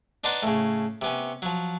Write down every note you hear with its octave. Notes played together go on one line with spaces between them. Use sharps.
D4 D#4 B4 C5 F#5 A5
A2 C#3
C3 B3 C#4
F3 F#3